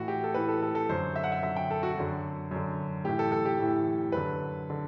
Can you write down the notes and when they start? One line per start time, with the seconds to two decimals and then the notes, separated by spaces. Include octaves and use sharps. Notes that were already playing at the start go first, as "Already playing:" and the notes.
Already playing: A2 E3 F#4
0.08 G4
0.24 A4
0.34 A2 E3 B4
0.49 A4
0.63 A4
0.75 A4
0.89 F#2 D3 C5
1.16 E5
1.24 F#5
1.32 E5
1.43 F#2 D3 E5
1.56 G5
1.71 A4
1.83 F#4
1.98 F#2 D3
2.51 F#2 D3
3.04 A2 E3 G4
3.19 A4
3.32 A4
3.45 G4
3.59 A2 E3
4.12 F#2 D3 B4
4.70 D3